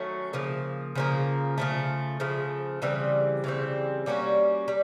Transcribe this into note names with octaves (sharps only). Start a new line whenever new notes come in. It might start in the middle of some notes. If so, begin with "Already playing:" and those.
Already playing: D#3 F#3 A3 C#4
C#3 F3 A#3
C#3 F3 A#3
C#3 F3 A3
C#3 F3 A3
C#3 E3 G3 C4
C#3 E3 G3 C4
G3 A#3 C#4 F#4
G3